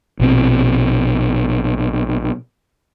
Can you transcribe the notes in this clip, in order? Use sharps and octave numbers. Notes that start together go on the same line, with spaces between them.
A#1 B2 C4